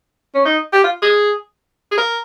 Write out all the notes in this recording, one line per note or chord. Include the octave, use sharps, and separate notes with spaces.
C#4
D#4
G4
F4
G#4
G#4
A#4